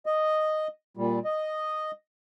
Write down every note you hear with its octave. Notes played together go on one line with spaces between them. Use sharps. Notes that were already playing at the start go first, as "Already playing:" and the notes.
D#5
A#2 G3
D#5